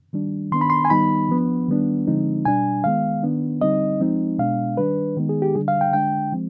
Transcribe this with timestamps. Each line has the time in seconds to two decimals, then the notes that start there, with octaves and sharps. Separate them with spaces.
0.13 D#3 G3 D4
0.52 D#3 B3 D4 C6
0.61 B5
0.70 C6
0.85 G#5
0.90 D#3 G3 B3 D#4 B5
1.29 F3 B3 D4
1.68 D#3 G3 B3 D4
2.07 D3 F3 G#3 C4 D#4
2.45 B2 G3 D4 G#5
2.84 D#3 G#3 B3 F5
3.23 D#3 B3 D4
3.61 D3 G3 C4 D#4 D#5
4.01 F3 G#3 C4 D#4
4.39 B2 G#3 B3 D4 F5
4.77 D#3 G3 D4 B4
5.17 D#3 G#3 B3 D#4
5.29 G#4
5.42 G4
5.55 D3 G3 D4 G#4
5.68 F5
5.81 G5
5.93 D3 G#3 D4 G5
6.33 F3 G#3 C4